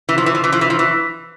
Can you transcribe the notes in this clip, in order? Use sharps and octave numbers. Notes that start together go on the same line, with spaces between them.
E3
F3
E3
F3
E3
F3
E3
F3
E3